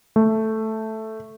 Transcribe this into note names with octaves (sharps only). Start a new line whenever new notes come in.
A3